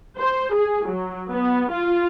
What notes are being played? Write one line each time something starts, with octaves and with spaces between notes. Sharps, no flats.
C5
G#4
F#3
B3
F4